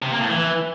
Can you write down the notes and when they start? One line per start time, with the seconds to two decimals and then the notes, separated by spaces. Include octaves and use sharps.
0.02 C3
0.11 A#3
0.21 A2
0.30 E3